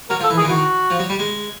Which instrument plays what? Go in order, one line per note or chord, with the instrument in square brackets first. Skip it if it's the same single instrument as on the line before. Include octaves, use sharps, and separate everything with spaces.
[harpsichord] F#3 [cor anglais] A#4
[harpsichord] F3
[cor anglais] A4
[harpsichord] E3
[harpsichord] D#3 [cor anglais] G#4
[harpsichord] E3
[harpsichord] D#3 [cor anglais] F#4
[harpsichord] F3
F#3
G3
G#3